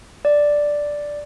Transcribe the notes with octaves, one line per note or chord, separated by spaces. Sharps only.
D5